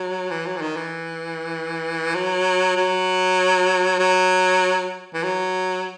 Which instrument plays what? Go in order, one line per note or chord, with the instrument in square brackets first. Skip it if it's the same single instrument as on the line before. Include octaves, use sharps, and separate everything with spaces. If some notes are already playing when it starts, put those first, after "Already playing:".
Already playing: [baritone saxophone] F#3
E3
F#3
E3
D#3
E3
F#3
F#3
F#3
E3
F#3